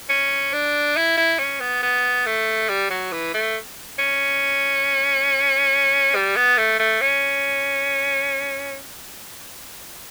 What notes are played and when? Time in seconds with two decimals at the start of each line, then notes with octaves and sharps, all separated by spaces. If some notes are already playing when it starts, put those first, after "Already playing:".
0.09 C#4
0.53 D4
0.96 E4
1.17 E4
1.39 C#4
1.60 B3
1.83 B3
2.26 A3
2.69 G3
2.90 F#3
3.12 E3
3.34 A3
3.99 C#4
6.15 G3
6.36 B3
6.57 A3
6.79 A3
7.01 C#4